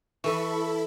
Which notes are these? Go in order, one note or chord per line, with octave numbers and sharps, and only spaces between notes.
E3 E4 A4 B5 C#6